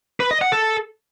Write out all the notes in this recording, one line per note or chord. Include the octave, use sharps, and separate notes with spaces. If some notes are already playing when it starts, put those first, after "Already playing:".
B4
D#5
F#5
A4